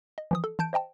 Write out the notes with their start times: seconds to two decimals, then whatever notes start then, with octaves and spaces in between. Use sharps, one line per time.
0.18 D#5
0.31 E3 F3 D#6
0.44 A4
0.59 E3 A5 G6 D7
0.73 C5 D#5 G5 A5